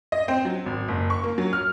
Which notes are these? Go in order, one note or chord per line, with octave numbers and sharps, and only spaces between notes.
D#5
C4
F#3
G#1
F#1
C#6
A#3
F#3
F6